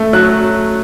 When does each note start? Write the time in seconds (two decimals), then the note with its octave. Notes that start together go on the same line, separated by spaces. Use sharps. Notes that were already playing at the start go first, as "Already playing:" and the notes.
Already playing: A3
0.13 F#3 F#6